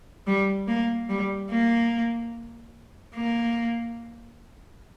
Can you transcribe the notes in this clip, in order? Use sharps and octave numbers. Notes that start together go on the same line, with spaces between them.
G3
A#3
G3
A#3
A#3